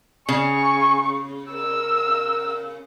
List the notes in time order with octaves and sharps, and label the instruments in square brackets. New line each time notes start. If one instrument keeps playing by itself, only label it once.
[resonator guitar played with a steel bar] C#3 [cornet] G#5 [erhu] C#6
[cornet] A#4 [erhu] E6